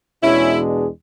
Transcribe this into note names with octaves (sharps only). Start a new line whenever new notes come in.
E2 B2 G#3 C#4 D4 E4 G#4